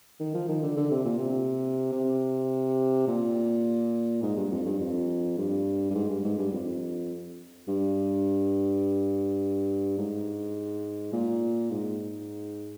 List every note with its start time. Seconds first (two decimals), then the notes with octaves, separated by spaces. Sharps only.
0.20 D#3
0.34 F3
0.48 D#3
0.63 D3
0.77 D3
0.91 C3
1.05 A#2
1.18 C3
1.92 C3
3.08 A#2
4.23 G#2
4.37 G2
4.51 F2
4.66 G2
4.80 F2
5.37 G2
5.90 G2
5.95 G#2
6.10 G2
6.24 G#2
6.38 G2
6.53 F2
7.68 G2
9.98 G#2
11.13 A#2
11.71 G#2